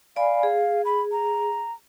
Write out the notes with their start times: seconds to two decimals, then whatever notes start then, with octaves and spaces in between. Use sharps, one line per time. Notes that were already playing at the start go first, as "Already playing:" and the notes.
0.16 D5 F5 G#5 B5
0.43 G#4
0.85 B5
1.12 A#5